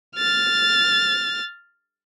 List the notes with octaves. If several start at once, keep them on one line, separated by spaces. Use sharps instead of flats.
F6 A6